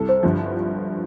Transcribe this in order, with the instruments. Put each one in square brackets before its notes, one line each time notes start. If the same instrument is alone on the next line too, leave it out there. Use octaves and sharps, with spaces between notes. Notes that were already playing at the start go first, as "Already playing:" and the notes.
Already playing: [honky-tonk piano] C2 A4
[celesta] C5
[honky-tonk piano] G1 G2 D3 F3